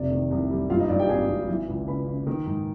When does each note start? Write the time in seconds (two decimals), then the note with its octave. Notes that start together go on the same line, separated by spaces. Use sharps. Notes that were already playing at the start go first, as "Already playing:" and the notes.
Already playing: F1 C3 D5
0.11 D#3
0.31 C2
0.50 G3
0.70 G2 F4 F5
0.80 D#4 D#5
0.89 G2 D5
0.99 G4 G5
1.09 G#1 G#4 G#5
1.29 G#1
1.48 E3
1.68 C#2
1.87 C#3 B4 B5
2.07 C#3
2.27 D#3
2.46 G#2